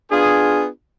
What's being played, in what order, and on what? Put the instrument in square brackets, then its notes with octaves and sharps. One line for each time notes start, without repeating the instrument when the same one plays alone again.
[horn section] B3 D4 F4 G#4